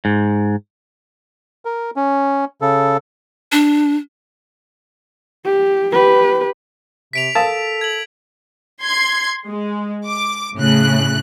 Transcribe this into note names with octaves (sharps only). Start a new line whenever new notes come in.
G#2
A#4
C#4
C#3 A4
D4
G4
G4 B4
C3 B6 D7 F7
A4 A#4 F5 A5 D#6
G#6 F#7
C6 G#6
G#3
D6
A2 C#3 F#6